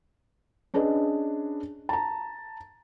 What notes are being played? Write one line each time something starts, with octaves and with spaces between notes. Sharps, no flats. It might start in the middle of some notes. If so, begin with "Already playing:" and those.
C#4 D4 G#4 B4 D#5
A5 A#5